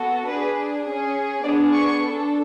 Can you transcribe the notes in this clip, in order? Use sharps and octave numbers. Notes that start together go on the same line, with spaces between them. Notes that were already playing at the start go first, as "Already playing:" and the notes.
Already playing: B3 F#4 A4
D4 G#4 B4
C#4 G#4
B3 D4 G#4 D5
C#6
D4 A4